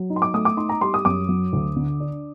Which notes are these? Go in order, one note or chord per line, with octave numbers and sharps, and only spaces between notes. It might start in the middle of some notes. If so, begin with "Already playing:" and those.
Already playing: F#3
D#4
C6
D6
A3 D#6
D6
D#4 C6
A#5
G3 C6
D#6
F#2 D6
F#3
D2
D3
D4